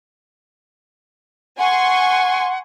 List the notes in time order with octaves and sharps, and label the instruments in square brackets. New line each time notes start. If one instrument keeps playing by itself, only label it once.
[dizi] F#5 [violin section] G#5 C6 C#6